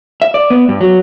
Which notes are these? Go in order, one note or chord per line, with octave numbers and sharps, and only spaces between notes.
E5
D5
B3
G2
F#3